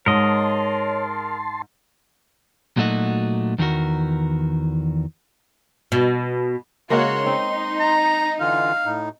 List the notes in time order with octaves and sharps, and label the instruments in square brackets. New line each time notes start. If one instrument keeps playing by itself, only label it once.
[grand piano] G#2 [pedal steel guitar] A#4 D#5 [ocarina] C#5 [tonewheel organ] A5 C6
[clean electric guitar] A#2 F#3 A3 D#4 F#4
E2 D#3 E3 F#4 A#4
[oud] B2
[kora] C#3 G#3 A#3 [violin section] F#4 C#5 [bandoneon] C6
[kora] C4 [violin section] D#4
[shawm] A#5
[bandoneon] D3 E3 F4 [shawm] F5
[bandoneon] A2 D#4